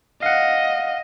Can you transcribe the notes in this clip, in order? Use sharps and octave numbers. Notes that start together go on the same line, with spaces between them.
D#5 F5 F#5